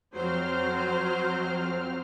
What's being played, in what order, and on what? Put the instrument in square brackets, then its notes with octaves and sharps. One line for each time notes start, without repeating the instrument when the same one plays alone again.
[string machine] F2 C4 F6 [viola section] F#3 C5